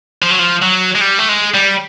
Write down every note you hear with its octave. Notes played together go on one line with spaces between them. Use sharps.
F3
F#3
F3
F#3
G#3
G3
A3
G#3
G3